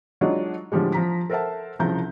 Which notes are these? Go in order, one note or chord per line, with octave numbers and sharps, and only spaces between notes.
F#3 G#3 D4 D#4 F4
A2 D3 F3 G3 G#3
F3 A#5 B6
A4 A#4 C5 E5 F#5 A5
C2 C#3 F3 A#5 G6